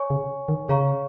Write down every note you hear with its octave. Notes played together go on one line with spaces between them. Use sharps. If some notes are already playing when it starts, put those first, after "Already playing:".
Already playing: C#5 G#5 C#6
C#3
D#3
C#3 G#4 C#5 F5 A#5 C#6